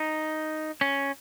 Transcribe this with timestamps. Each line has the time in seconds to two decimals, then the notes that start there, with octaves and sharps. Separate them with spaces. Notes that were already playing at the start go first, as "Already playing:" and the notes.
Already playing: D#4
0.81 C#4